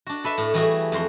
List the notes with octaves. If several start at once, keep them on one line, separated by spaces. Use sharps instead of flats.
D4 F#4
A4 B4 E5
A2
E3 G3 A3 F#4 G#4
F2 F#4 C6